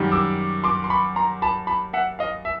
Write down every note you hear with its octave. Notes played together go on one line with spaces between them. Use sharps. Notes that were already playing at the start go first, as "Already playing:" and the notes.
Already playing: F#2 D#3 G3
D6 E6
C6 D6
C6
B5 C#6
A#5 C6
A5 B5
A5 B5
E5 F#5
D#5 F5
E5